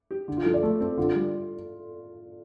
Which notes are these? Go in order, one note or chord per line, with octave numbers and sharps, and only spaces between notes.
G4
D3
F4
F3 A4
D5
A3 A4
C4 A4
D3 F4
G3